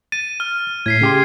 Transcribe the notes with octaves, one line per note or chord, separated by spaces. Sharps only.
A6 D#7
F6
A2 G#6 B6 C7
C#3 G4 C6